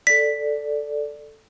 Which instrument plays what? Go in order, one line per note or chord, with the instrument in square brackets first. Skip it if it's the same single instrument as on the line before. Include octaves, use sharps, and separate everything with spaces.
[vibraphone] A4 D5 [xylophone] B6